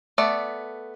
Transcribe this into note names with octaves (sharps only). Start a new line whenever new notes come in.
A3 B3 D5